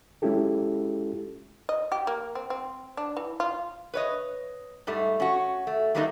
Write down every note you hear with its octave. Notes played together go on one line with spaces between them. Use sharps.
G#3 C#4 E4 F4 G4 A4
D#5
G4
A#3
C4
C4
D4
E3
F4
B4 C#5 D#5
G#2 G3 A3
C#4 F#4
A3
F#3 G3 A3 A#3 C#4 D#4